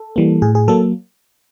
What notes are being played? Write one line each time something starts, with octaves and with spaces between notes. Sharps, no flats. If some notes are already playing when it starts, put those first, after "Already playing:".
Already playing: A4
E3 G3 A#3
A2 G#4
G#4
F#3 A#3 A4